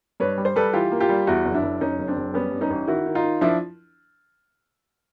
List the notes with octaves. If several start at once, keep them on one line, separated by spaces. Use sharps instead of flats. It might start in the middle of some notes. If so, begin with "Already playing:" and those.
G2 B4 C#5
G3
C5
G3 A4 B4
E3 F4 G4
A#3
F4 G4
G3
E2 E4 F#4
F#1
D4 E4
F#1
F#1 C#4 D#4
F#1
C4 D4
F#1
G3 B3 C#4
G2
C#4 D#4
A1
D#3 E4 F#4
D#3
D#4 F4
D#3
F3 D4 E4